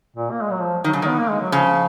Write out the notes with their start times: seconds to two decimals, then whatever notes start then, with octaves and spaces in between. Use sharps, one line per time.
0.16 A#2
0.31 A#3
0.41 G#3
0.51 F#3
0.62 F3
0.84 D#3 F#3
0.93 C#3
1.02 D#3 B3
1.18 A#3
1.29 G#3
1.41 F#3
1.52 C#3 F3